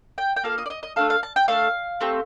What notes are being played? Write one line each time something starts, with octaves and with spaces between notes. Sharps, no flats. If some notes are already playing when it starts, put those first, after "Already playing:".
G5
G5
A#3 F4 A4 F5
D#5
D5
D#5
D#5
A3 D4 A4 F5
F5
A5
G5
A3 D4 A4 F5
A3 C4 G4